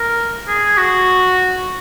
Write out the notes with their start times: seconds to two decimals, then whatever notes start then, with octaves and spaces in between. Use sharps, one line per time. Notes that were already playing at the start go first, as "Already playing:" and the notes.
Already playing: A#4
0.47 G#4
0.78 F#4